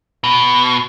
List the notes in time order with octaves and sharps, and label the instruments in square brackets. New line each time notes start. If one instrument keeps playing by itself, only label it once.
[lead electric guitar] B2